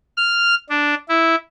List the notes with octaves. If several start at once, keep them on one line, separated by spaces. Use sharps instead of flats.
F6
D4
E4